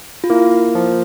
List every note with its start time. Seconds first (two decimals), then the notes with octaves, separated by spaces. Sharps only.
0.24 F4
0.30 A#3 E4
0.75 F3